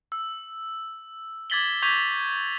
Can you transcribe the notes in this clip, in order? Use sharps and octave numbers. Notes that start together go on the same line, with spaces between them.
E6
D6 G#6 A6 B6 F#7 G7
C#6 D6 G6 G#6 B6 F7